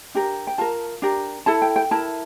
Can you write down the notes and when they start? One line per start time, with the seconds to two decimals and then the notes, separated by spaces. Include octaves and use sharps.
0.15 D4 G4 A#4
0.47 G5
0.58 F4 A#4 A5
1.02 D4 G4 A#4
1.46 E4 A4 A5
1.62 G5
1.76 G5
1.91 E4 A#4 A5